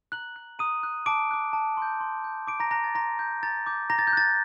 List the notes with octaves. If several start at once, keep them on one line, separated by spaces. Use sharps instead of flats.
A#5 F#6 F#7
F#6
A#5 D#6 D#7
F#6
A5 D6 D7
D6 F#6
A5
C6 G6
C6
G6
C6 D6 D7
A#5 A#6
A#5 F#6 A#6
A6
A#5 C6 A#6
G6
A#5 A6
D6 G6
A#5 A#6
A6
G6
F#6 A6